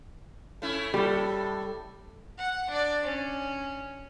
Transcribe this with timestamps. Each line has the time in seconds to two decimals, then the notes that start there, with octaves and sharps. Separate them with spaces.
0.62 A3 C#4 E4
0.94 A2 G3 A4
2.38 F#5
2.70 D4 D5
3.03 C#4